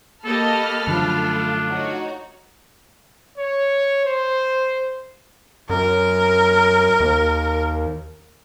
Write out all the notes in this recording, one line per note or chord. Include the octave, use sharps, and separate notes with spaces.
A#3 G4 A4 D#5 A5 B5 F6
F#2 D3 F3 A3 D4 F4 A4
D#4 F#4 C#5
C#5
C5
F#2 A#4
D#2